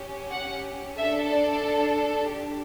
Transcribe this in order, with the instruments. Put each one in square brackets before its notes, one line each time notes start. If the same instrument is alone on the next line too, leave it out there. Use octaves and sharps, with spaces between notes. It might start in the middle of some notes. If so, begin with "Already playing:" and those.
Already playing: [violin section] C#4 G4
F#5
D4 A4 E5
D5
D4 G4